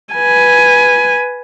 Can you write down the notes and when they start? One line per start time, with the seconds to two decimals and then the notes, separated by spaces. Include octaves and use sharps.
0.15 B4 G#5